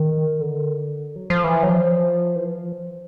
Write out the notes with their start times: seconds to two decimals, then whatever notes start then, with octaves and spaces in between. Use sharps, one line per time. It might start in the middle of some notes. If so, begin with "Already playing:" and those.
Already playing: D#3
0.40 D3
1.16 F#3
1.30 F3
1.44 E3
1.63 F#3
1.70 F3
2.36 E3
2.45 F3